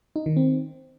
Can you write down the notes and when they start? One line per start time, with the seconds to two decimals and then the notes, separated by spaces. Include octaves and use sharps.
0.16 D#4
0.26 D#3
0.37 C4